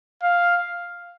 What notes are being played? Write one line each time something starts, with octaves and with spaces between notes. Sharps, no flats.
F5